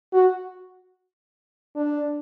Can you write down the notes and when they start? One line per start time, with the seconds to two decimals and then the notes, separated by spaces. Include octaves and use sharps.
0.13 F#4
1.76 D4